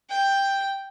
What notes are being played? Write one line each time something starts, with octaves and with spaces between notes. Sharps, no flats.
G5